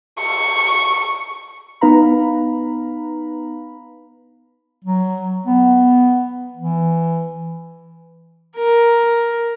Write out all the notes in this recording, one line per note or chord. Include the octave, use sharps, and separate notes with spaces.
C#6
B3 D#4 B4 F5 A#5 B5
F#3
B3
E3
A#4